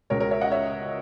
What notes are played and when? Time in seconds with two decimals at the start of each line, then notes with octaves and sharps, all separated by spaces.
0.10 C#2 B2 G#3 A#4 C#5
0.20 A#4 C#5
0.31 C#5 E5
0.41 D#5 F#5
0.52 C#5 E5